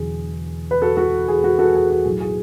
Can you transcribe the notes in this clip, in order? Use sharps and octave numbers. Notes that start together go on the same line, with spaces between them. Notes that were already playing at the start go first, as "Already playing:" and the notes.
Already playing: E1 E2 D3 F#3 G#4
B4
F#4 A4
F#4 A4
G#4
F#4
F#4 A4
G#4
F#4
B1 A2 F#3 G#4
G#4